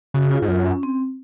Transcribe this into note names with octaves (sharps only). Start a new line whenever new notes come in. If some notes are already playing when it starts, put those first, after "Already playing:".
C#3 F#4
F4
G#2
F#2 F4
C#4
C4